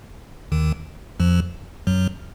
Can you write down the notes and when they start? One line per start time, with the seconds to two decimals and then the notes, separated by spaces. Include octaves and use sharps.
0.52 D#2 D#3
1.20 F2 F3
1.87 F#2 F#3